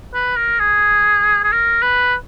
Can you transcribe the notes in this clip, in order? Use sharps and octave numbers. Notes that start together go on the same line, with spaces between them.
B4
A#4
G#4
G#4
A#4
B4